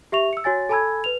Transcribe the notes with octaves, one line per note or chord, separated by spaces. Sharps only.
G4 E5 C#6 F7
E6 C#7
F#4 C#5 G#5 A6
A4 G#5 A5 B5 E6 G#6
B4 F7